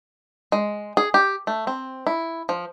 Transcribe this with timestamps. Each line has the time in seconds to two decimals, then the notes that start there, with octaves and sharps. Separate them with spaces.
0.52 G#3
0.97 G#4
1.14 G4
1.47 A3
1.67 C4
2.07 E4
2.49 F3